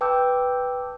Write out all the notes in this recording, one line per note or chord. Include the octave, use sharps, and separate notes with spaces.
B4 G5 A5 D6 E6 G6